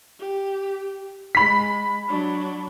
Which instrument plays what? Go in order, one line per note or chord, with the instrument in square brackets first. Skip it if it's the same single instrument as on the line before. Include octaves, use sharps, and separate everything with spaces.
[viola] G4
[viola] G#3 [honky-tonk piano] B5 B6
[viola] F#3 D4